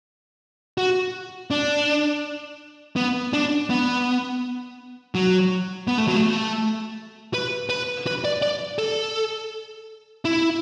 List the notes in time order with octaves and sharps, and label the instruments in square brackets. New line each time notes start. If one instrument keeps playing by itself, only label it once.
[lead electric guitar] F#4
D4
B3
D4
B3
F#3
B3
A3
F#3
A3
B4
B4
B4
D5
D5
A4
E4